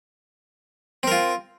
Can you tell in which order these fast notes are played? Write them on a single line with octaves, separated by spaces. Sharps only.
C4 A#4 F4